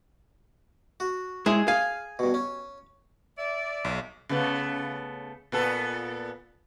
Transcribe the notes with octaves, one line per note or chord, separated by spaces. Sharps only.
F#4
G#3 E4 G#4 E5
G#4 F5 G#5
G2 B2
C#4
D5 E5
B1
C#3 A3 B3
A#2 B3 A4